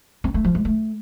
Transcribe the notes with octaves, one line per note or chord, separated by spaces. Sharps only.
C4
A3
F3
G#3
A3